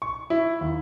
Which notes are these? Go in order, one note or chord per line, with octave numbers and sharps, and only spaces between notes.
C#6
E4
D#2